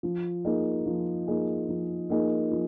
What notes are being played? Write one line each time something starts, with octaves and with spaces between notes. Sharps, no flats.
F3
A#3 D#4 G#4
F3
A#3 D#4 G#4
F3
A#3 D#4 G#4
F3